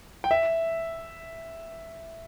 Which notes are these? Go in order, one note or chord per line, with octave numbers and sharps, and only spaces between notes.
G5
E5